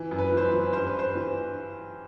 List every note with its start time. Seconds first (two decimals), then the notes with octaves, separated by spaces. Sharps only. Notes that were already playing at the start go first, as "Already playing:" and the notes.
Already playing: E3
0.11 F#2
0.18 B4
0.32 E3 C5
0.45 B4
0.53 E3
0.73 G2 C5
0.87 B4
0.94 G2 C5
1.15 E3